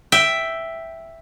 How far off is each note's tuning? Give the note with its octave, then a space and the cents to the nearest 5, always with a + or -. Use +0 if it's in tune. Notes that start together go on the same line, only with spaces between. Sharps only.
E5 +0 G5 +0